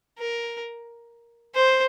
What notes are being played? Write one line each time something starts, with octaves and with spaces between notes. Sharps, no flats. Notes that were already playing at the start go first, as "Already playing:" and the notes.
A#4
C5